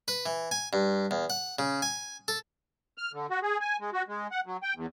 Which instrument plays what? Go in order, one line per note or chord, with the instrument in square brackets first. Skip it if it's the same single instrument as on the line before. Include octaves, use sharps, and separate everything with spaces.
[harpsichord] B4
E3
G#5
G2
E2
F#5
C#3
G#5
A4
[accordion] F6
D3
F#4
G#4
G#5
G#3
F#4
G#3
F#5
F#3
G5
E2